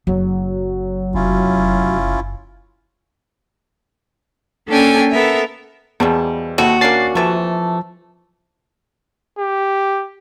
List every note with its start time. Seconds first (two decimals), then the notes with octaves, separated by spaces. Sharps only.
0.07 F#1 F#3
1.15 F1 C#4 E4 F4
4.67 A#3 C#4 D4 A4 G5 G#5
5.13 B3 A4 A#4 E5
6.00 E2 B2 F3 G3
6.58 D#2 C4 E4 F#4 A4
6.81 A#3 C#4 D4 A6 C7
7.15 C3 E3 F3 A3 A5
9.39 G4